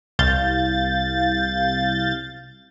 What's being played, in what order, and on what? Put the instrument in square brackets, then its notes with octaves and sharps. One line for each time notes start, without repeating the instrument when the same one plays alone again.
[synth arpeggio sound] C2 F5 G6 A6